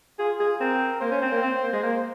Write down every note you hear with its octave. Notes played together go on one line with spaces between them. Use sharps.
F4 G#4
G#4
C4 A#4
A#3 C5
C#4
C4
A#3
C4
A#3
G#3
A#3